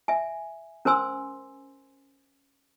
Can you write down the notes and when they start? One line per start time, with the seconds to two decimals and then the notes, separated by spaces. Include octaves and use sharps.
0.08 E5 G#5
0.85 C#4 A#4 C5 G#5 C6 E6